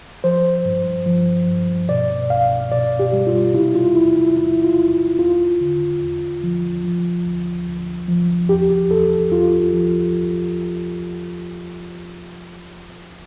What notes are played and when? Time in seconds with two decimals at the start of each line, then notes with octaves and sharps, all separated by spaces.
0.24 F3 C5
0.65 G2
1.06 F3
1.48 G2
1.89 B2 D5
2.30 C2 F5
2.72 B2 D5
2.99 G4
3.13 G3
3.27 F4
3.54 C3 E4
3.75 F4
3.95 E2 E4
4.16 E4
4.37 E2 E4
4.64 F4
4.78 E2
5.19 E2 F4
5.61 D3
6.02 E2
6.43 F3
6.85 F3
7.25 D2
7.67 D2
8.08 F3
8.49 E2 G4
8.91 E2 A4
9.32 E2 F4
9.73 F3